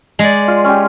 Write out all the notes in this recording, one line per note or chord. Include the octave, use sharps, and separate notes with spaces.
G#3 D5
F4
C#4 G4